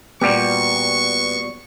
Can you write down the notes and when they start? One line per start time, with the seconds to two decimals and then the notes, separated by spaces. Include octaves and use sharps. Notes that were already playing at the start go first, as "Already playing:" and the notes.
0.22 A#2 G3 B3 F#4 G4 C#6